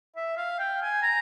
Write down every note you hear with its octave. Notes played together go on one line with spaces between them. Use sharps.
E5
F5
G5
G#5
A#5